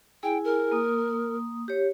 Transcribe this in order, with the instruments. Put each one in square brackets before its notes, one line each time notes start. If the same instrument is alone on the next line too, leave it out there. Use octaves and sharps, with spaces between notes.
[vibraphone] E4 G#4 G#5 [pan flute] G5
[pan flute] A#4
[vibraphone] A#3 D#6
G4 C#5